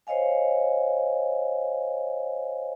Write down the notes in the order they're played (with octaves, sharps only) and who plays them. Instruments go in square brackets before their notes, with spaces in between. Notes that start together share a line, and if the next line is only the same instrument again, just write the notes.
[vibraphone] C5 C#5 D#5 F5 G#5